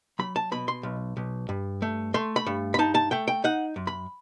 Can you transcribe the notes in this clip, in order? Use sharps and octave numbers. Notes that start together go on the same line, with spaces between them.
F#3 B5
A5
B2 B5
C6
B1
B1
G2
A3
A3 C6
B5
G2
B5
D#4 A5
A5
A3 G5
G5
D#4 F#5
F#2
B5